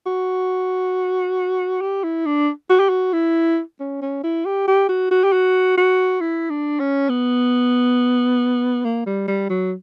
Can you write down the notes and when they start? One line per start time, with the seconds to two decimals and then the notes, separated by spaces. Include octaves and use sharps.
0.06 F#4
1.81 G4
2.04 E4
2.26 D4
2.69 F#4
2.79 G4
2.89 F#4
3.13 E4
3.80 C#4
4.01 C#4
4.23 E4
4.46 G4
4.68 G4
4.89 F#4
5.11 F#4
5.24 G4
5.32 F#4
5.77 F#4
6.21 E4
6.50 D4
6.80 C#4
7.09 B3
8.85 A#3
9.06 G3
9.28 G3
9.50 F#3